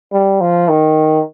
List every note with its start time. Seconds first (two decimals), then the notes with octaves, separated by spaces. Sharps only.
0.12 G3
0.41 F3
0.69 D#3